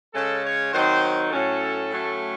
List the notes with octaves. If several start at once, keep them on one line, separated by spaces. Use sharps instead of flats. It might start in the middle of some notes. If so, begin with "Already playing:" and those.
C#3 G#3 C#4 A4
C#5
D#3 F#3 C4 D#4 C5
A2 F#3 C#4 A4
A2 F#3 A3 C#4